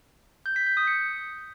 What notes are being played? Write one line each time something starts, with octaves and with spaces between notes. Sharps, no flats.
G6
B6
G6
D#6
C#7